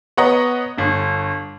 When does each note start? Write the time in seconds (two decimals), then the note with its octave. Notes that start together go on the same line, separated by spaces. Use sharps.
0.17 B3 C#5 D#5 F#5 A#5
0.78 G1 G2